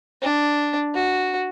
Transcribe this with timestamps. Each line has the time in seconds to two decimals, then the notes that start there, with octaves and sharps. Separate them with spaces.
0.22 D4
0.94 F#4